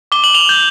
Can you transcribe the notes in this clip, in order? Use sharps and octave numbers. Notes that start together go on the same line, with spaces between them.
D6 G7
F#7
F7 G7
G6